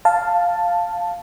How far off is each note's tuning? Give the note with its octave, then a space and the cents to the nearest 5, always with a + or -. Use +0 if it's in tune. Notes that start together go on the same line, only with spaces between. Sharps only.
F5 +0 A5 +5